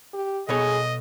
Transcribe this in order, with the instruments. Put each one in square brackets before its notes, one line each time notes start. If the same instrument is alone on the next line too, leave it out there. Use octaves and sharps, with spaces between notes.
[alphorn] G4
[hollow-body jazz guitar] B2 A4 C#5 [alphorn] G#4 [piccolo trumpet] D#5